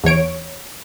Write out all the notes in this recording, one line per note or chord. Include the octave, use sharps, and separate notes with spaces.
E2 E3 C#5 D7